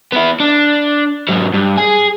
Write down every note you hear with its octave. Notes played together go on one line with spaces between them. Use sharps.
B3 E4
D4
G#2 F#3
G2
G#4